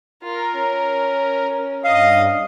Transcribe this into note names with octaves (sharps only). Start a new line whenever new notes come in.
F4 A#4
C#4
G2 D#5 F5